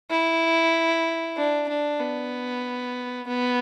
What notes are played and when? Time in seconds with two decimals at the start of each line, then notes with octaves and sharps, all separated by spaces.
0.10 E4
1.37 D4
1.69 D4
2.00 B3
3.27 B3